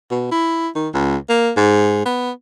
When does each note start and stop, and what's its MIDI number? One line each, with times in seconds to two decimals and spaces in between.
0.11 0.27 47
0.32 0.68 64
0.75 0.89 51
0.94 1.17 37
1.29 1.51 58
1.57 2.04 44
2.05 2.31 59